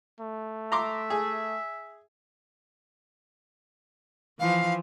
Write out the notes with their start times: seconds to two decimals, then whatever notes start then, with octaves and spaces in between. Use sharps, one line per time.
0.20 A3
0.72 E5 A#5 C6 D6
1.10 G#4
4.39 E3 F3 F5